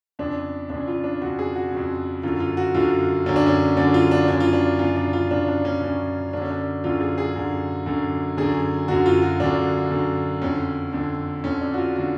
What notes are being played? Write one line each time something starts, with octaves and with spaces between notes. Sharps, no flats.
F2 C#3 D4
F2 C#3 D4
F4
D4
F2 C#3 F#4
G#4
F#4
F2 C#3
F#2 D3 F4
F4
F#4
F#2 D3 F4
F#2 D3 C#4
D4
C#4
F#2 D3 D4
F4
D4
F#2 C#3 D4
F4
D4
F#2 C#3 F4
D4
F4
F#2 C#3 D4
D4
C#4
F#2 C#3 D4
F#2 D3 C#4 D4
D4
F#2 D3 F4
G#4
G#4
F#2 D3
F#2 D3
F#2 D3 G#4
F#2 D3 F#4
F4
F#4
F#2 D3 D4
F#2 D3
F2 D3 C#4
F2 D3
F2 D3 C#4
D4
F#4
F4
D3 F#4